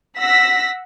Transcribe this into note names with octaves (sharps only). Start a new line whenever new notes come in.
F#5 E6 A#6 B6